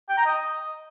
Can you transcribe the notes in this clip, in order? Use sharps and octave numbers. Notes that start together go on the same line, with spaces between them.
G5
A#5
D#5